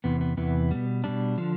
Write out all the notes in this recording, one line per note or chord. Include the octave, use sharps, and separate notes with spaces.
E2 C3 E3 B3
B3
E2 C3 E3 B3
B2 G3
B2 G3 D4
D3 F3